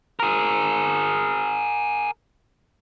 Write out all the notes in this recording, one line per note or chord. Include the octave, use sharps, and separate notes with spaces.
G#4 A#4